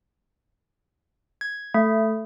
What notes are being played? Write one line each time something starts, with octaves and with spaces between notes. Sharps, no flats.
G#6
A3